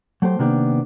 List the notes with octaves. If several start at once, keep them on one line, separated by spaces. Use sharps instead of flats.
F#3 A3 G4 C5
C3 D#3 A#3 B3 D4 G4